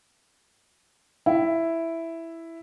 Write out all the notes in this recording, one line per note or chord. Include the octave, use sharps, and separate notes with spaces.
E4